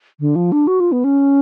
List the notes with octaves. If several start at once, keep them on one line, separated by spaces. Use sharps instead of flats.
D3
F3
D4
F#4
F4
B3
C#4